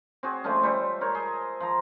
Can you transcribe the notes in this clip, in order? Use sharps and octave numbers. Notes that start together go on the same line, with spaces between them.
C4 F#4 G#4
F3 G#3 A3 C#4
G3 C5 E5
A#4 C5 C#5
G#4 C6
F3 A#5